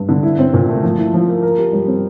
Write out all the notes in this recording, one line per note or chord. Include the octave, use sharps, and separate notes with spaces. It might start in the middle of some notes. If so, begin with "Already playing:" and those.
Already playing: G2
D3
E4
C4
A#2
A3
F3
E4
F3
A#3
A#4
G4
G3
C4